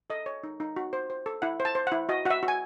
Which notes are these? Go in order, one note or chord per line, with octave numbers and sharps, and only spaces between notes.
A4 D#5
C#5
D#4
D#4
F#4
C5
C5
A4
E4 F#5
C5
A5
C5
E4 F#5
F#4 D#5
F#4 E5 F#5
F#4
G#5